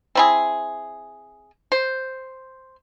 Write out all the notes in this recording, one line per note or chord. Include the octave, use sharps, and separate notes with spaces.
C4 E4 G#4
C5